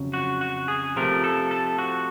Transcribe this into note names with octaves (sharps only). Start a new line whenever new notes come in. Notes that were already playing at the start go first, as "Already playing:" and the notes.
Already playing: F2 C#3 F#3
F#4
F#4
G#4
C3 F3 A3 A#4
A4
A4
F#4